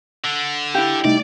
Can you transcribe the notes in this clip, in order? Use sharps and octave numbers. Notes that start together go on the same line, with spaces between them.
D3
E4 G4 F5 F#6 B6
C3 G3 A3 D#4 D5